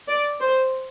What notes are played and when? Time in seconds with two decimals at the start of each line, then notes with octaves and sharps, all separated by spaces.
0.09 D5
0.41 C5